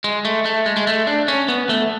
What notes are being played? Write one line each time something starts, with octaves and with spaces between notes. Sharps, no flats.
G#3
A3
A3
G#3
G#3
A3
D4
C#4
B3
A3